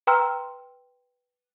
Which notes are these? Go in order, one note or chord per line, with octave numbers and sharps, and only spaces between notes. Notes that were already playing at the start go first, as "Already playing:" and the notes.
B4 G5 A#5 C6 E6 F6